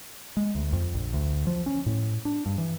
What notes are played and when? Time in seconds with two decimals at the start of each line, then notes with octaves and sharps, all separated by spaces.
0.37 G#3
0.55 D2
0.73 F2
0.94 A#1
1.13 D2
1.47 F3
1.66 C#4
1.86 A2
2.25 D4
2.46 G2
2.58 E3